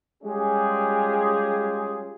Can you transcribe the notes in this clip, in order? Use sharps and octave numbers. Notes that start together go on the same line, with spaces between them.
G3 G#3 C#4 F4 G4 G#4